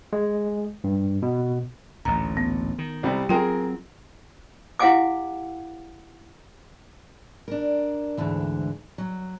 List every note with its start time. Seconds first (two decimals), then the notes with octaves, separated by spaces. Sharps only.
0.13 G#3
0.84 G2
1.22 B2
2.05 A1 D2 A#2 A#5
2.37 B3
2.79 D#3
3.03 C2 C3 G3
3.29 F#3 B3 C4 F4 G#4 A#4 G5 C6
4.79 E4 G4 F5 F#5 G#5 D6
7.48 D4 A#4
8.17 D2 G#2 D3 E3
8.98 F#3